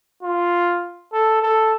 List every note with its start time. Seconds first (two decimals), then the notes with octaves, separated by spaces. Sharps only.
0.23 F4
1.13 A4
1.42 A4